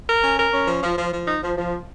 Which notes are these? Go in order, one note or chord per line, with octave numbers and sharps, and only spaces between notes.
A#4
C#4
A#4
C#4
F3
F3
F3
F3
D#4
F3
F3